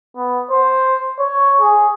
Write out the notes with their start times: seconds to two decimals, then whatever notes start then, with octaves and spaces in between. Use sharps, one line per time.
0.16 B3
0.51 C5
1.20 C#5
1.61 G#4